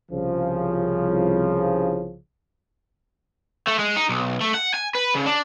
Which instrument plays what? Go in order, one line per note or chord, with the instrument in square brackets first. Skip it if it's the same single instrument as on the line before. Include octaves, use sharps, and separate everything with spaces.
[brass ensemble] C2 C#3 F3
[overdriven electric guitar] A3
G#3
D#4
B1
A3
F#5
G#5
B4
C#3
D4